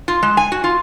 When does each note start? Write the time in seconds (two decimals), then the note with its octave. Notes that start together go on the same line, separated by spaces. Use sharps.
0.08 F4
0.23 G#3
0.37 G#5
0.52 F#4
0.64 F4